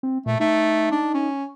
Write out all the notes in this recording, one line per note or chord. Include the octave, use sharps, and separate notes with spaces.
C4
A#2 A3
A3 D#4
D4
C#4